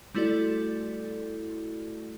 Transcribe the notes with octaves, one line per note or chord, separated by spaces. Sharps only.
G3 A3 E4 F#4 A4 D5